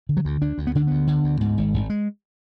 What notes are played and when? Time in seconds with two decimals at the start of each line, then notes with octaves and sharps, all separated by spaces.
0.09 D3
0.17 F#3
0.25 D2
0.42 D2 D4
0.58 D2
0.67 B3
0.75 D3 D4
0.87 D2 B3
1.07 D3
1.24 D2
1.41 G#2
1.57 G#1
1.74 G#1
1.90 G#3